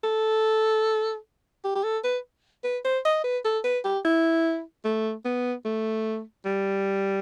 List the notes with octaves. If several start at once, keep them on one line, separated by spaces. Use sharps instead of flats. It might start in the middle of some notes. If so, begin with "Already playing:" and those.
A4
G4
G4
A4
B4
B4
C5
D#5
B4
A4
B4
G4
E4
A3
B3
A3
G3